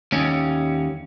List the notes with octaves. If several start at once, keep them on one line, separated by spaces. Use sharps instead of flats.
D#2 C#4